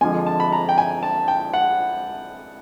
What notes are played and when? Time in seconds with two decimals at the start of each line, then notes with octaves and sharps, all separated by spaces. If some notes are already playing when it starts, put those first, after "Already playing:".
0.01 F2 D3 F3 G#3 G#5
0.27 A5
0.40 B5
0.52 A#5
0.69 G5
0.78 G#5
1.03 A5
1.28 G5
1.53 F#5